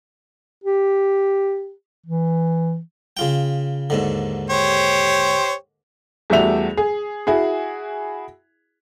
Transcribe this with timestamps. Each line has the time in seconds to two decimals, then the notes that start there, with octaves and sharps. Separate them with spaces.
0.64 G4
2.06 E3
3.17 C#3 F4 G5
3.90 D#2 G#2 D3
4.50 G4 C5 C#5
6.30 E2 G3 A3 F#4 E5 F7
6.77 G#4
7.27 E4 F#4 G#4